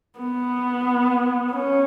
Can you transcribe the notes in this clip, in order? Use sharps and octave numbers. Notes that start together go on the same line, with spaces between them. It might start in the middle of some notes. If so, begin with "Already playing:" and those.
B3
C#4